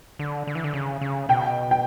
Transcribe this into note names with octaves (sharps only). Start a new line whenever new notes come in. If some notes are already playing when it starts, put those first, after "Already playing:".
D3
D3
E3
D3
C#3
C#3
B2 G5
G5